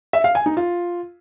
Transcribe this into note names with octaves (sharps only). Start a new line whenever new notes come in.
E5
F5
G#5
D#4
F4